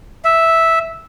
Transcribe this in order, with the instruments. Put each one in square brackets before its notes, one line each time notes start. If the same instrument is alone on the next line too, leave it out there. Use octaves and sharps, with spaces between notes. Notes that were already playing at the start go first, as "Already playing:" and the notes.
[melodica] E5